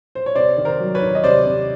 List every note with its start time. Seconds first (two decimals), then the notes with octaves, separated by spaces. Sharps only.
0.15 C5
0.26 C#5
0.35 C3 C5 D5
0.57 D#3
0.65 A#4 C5
0.80 F#3
0.95 B4 C#5
1.02 D#3
1.15 D#5
1.24 C3 C5 D5
1.46 C3